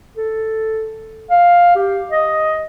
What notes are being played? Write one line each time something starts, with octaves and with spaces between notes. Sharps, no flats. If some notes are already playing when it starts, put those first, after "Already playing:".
A4
F5
G4
D#5